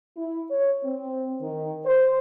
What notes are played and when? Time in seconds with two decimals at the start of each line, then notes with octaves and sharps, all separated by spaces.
0.17 E4
0.49 C#5
0.83 C4
1.41 D#3
1.85 C5